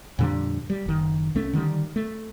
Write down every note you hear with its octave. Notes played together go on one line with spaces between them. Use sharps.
F2 A#2 D3 G3
G3
F#1 D#3
C2 A3 C#4
D3 D#3 G3
A3